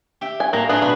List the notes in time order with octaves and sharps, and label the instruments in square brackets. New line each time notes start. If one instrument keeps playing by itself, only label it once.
[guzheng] G4 E5 G5
[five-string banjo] G#5
[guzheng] A2 A#5 [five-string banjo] A#3
[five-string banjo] B3 [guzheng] D4 F4 G#4
[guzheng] B2 F#4 [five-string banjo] B4